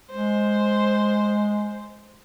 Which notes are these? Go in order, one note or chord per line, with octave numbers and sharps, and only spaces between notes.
G#3 C5